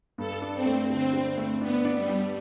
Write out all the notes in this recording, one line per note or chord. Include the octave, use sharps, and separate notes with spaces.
G2 A4
D4
C4
A3
D3 C4
D3
A3
B3 D4
D4
G3
D4